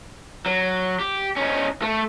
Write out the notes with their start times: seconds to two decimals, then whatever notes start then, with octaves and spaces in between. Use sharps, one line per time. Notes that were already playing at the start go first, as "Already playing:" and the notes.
0.46 F#3
0.99 G4
1.36 C#4 D#4
1.82 A3